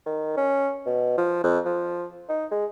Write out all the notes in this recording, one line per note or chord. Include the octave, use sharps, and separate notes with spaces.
D#3
C#4
B2
F3
F2
F3
D#4
G#3